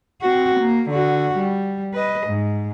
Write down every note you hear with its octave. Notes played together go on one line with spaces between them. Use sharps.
C4 F#4
A#3
D3 F#4
G3
B4 D#5
G#2